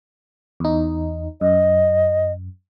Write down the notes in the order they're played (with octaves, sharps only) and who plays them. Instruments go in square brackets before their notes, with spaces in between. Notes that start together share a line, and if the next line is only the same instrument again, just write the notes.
[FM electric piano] E2 D#4
[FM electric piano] F#2 [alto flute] D#5